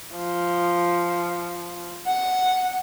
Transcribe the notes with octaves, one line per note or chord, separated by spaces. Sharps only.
F3
F#5